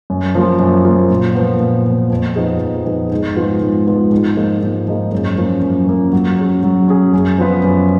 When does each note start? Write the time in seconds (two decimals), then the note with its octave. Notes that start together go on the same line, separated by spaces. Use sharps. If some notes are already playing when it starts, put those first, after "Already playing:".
0.10 F#2
0.35 F3 A#3 F4
0.60 F#2
0.85 F3 A#3 F4
1.10 A#2
1.35 F3 B3
1.60 A#2
1.85 F3 B3
2.10 F2
2.36 F3 B3 D#4 G#4
2.61 F2
2.85 F3 B3 D#4 G#4
3.12 G#2
3.36 F3 G#3 B3 F4
3.62 G#2
3.87 F3 G#3 B3 F4
4.12 G#2
4.36 F3 A#3 D#4 G#4
4.62 G#2
4.88 F3 A#3 D#4 G#4
5.12 F#2
5.38 F3 A#3 C#4
5.63 F#2
5.87 F3 A#3 C#4
6.13 F#3
6.38 C#4 G#4
6.64 F#3
6.88 C#4 G#4
7.13 F#2
7.38 F3 B3 F4 B4
7.64 F#2